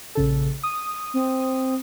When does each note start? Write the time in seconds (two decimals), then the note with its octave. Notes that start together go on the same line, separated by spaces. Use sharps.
0.15 A#1 C#3 A4
0.63 D#6
1.14 C4